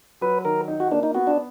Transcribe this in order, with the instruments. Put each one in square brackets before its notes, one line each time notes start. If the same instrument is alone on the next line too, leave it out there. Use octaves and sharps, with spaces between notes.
[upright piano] F#3 [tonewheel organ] B4
[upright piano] D#3 [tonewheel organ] A#4
[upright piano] D#4
[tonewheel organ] F#4
[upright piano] A#3 [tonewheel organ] D4
[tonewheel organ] D#4
[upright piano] B3 [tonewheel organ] F#4
[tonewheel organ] D4